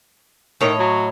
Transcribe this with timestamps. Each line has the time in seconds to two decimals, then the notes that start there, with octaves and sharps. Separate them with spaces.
0.61 A2 D#3 C#5 D#5
0.79 F#3